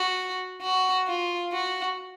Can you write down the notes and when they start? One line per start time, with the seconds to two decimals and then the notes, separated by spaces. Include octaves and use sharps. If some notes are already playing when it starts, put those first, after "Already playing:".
Already playing: F#4
0.62 F#4
1.07 F4
1.52 F#4